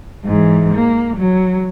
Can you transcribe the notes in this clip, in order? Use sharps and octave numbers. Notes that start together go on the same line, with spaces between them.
G#2 E3
A#3
F#3